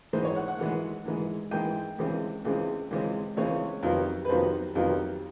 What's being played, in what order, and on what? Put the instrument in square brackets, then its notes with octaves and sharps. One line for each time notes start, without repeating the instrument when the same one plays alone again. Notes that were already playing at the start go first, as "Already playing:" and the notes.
[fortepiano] G#2 E3 G#3 C5
C#5
F#5
F#5
G#2 E3 G#3 F#5
G#2 E3 G#3
G#2 E3 G#3 G5
C#2 C#3 E3 G#3 C4
C#2 C#3 E3 G#3 C4
C#2 C#3 E3 G#3 C4
C#2 C#3 E3 G#3 C4 C#5
F2 C3 D#3 F#3 B3
B4
F2 C3 D#3 F#3 B3 C5
F2 C3 D#3 F#3 B3